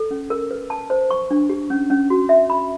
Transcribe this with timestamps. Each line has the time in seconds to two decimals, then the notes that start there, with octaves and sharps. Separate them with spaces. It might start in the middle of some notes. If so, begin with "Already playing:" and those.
Already playing: A4
0.11 C#4
0.30 A#4
0.51 B4
0.70 A5
0.90 C5
1.11 C#6
1.31 D4
1.49 G4
1.70 C#4
1.90 C#4
2.10 F#4
2.29 E5
2.50 B5